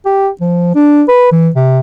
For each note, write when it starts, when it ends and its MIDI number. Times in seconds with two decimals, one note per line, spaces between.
0.06 0.29 67
0.41 0.73 53
0.75 1.03 62
1.08 1.29 71
1.32 1.49 52
1.56 1.80 48